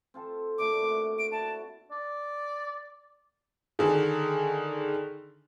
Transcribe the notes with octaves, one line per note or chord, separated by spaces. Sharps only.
C4 F4 A4
A#2 A3 D4 D6
C3 F#4
D7
E4 F#4 A5
D5
D3 D#3 G#4